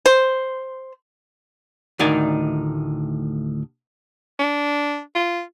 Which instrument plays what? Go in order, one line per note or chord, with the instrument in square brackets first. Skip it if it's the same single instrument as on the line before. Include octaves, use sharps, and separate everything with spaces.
[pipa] C5
[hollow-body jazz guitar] D2 A2 D#3 D#4 D5 G#5
[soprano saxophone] D4
F4